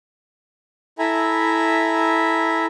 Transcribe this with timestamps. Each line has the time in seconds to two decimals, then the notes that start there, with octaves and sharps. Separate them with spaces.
0.99 E4 A4 E5 G#5 A#5 B5